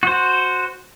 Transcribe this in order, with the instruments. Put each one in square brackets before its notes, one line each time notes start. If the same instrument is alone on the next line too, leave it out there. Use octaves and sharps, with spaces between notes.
[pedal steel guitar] F#4 C5